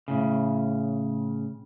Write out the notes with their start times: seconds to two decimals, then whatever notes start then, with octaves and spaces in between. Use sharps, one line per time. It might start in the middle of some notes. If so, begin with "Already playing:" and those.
0.08 A2 C#3